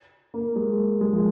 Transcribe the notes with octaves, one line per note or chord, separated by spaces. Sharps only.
A#3
G#3
G#3
F3